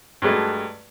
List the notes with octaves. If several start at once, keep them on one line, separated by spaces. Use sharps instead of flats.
G2 F#3 G#3 A3